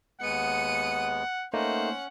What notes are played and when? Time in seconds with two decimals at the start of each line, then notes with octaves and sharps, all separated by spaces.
0.21 D#2 G#3 B3 F#5 C#7 D#7
1.53 A3 A#3 C#4 D#4 C5 F#5